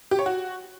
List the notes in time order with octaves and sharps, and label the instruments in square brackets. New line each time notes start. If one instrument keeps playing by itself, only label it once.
[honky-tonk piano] G4
C#5
F#4